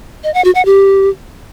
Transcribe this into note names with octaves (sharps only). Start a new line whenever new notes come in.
D#5
F#5
F#4
F#5
G4